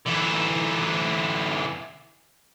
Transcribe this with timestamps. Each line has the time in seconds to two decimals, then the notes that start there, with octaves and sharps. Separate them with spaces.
0.06 D3 E3